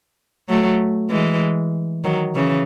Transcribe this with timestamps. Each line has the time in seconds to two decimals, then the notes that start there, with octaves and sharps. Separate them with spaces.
0.49 F#3 A3
1.10 E3 G#3
2.04 D#3 F#3
2.35 C#3 E3